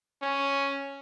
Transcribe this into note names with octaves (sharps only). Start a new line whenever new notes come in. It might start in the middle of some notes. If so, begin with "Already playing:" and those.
C#4